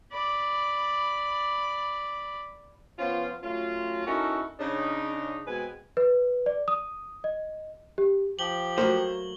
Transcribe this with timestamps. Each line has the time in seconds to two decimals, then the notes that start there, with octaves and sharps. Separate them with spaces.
0.12 D5 B5
2.99 F3 B3 C#4 F4
3.42 F#3 A3 C#4 F4
4.07 C#4 D#4 E4 F#4 A4 A#4
4.60 C#3 D4 D#4
5.47 B2 G#3 C4 B4 G#5
5.97 B4
6.46 D5
6.68 D#6
7.24 D#5
7.98 G4
8.39 F3 G4 F#7 G7
8.78 F#3 A3 A#3 C5